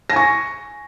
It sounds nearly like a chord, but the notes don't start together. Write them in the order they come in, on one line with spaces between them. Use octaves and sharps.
A#6 G#5 C#6